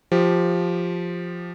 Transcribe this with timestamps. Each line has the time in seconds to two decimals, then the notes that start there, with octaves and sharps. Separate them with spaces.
0.12 F3 G4